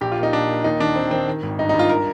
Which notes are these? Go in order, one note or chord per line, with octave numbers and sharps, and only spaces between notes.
A#1 G4
F4
A#2
D#4
A#1 D4
A#2
D#2 D#4
D#3 D4
D#2 C4
D#3 C4
D#3
G#1
G2 D#4
G2 D#4
F4
A#4